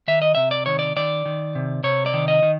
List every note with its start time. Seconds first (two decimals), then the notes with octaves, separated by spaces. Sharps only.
0.08 D#3 E5
0.22 D#5
0.35 C3 E5
0.51 D5
0.66 D#3 C#5
0.79 D5
0.96 D#3 D5
1.26 D#3
1.55 C3
1.84 C3 C#5
2.06 D5
2.14 D#3
2.28 D#5
2.42 D#3